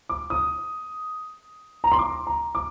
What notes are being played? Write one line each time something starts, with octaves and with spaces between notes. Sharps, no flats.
D6
D#6
A#5
C6
D6
A#5
D6